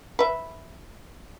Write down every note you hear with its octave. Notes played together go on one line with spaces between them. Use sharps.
B4 E5